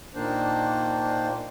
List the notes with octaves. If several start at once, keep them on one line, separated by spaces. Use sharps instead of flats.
A#2 D#3 A#3 D4 C5